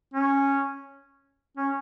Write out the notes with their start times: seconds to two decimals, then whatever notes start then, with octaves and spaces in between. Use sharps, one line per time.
0.14 C#4
1.57 C#4